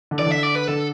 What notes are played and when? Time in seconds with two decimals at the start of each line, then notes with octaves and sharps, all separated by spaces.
0.11 D3
0.19 E3 D5
0.26 D3 E5
0.43 D5
0.55 B4
0.67 D3 A4